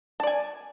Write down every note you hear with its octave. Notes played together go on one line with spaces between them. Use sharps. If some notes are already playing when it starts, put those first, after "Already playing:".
D5 G#5 A5